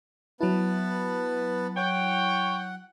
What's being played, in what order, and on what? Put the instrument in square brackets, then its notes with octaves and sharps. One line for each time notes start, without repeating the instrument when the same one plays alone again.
[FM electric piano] F#3 E4 [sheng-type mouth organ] B3 B4 A5
[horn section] C#5 G5 [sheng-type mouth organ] F#5